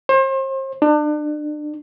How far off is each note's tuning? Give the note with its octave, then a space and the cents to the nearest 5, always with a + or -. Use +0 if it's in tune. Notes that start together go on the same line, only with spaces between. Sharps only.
C5 +35
D4 +35